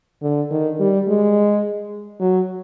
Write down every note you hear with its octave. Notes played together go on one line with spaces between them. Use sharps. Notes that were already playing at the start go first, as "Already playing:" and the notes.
D3
D#3
G3
G#3
F#3